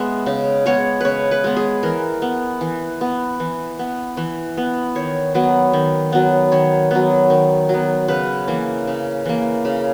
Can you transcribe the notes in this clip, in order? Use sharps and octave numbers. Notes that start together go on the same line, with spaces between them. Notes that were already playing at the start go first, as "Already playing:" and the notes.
Already playing: G#3 B3 E5
C#3
G#3 B3 C#5
C#3 B4 C#5
B4
G#3 B3
G#4
E3 A#4
B3
E3
B3
E3
B3
E3
B3
D#3 C#5
F#3 B3
D#3
F#3 B3
D#3 C#5
F#3 B3
D#3
F#3
B3
C#3 B4
E3 A#3
C#3
E3 A#3
C#3